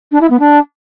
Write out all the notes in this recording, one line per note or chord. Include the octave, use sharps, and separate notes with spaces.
D4
E4
B3
D4